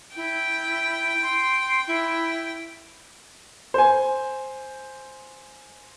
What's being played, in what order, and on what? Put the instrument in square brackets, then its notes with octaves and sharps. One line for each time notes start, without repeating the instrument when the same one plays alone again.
[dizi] E4 [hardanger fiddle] G5
[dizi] C6
E4
[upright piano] C5 G#5